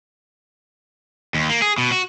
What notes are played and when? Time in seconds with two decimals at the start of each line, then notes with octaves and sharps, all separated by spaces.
1.34 D#2
1.49 A#3
1.62 G#4
1.78 B2
1.92 F#4